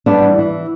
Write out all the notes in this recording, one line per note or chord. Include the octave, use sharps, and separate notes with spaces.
G3 B3 D4
E3
E3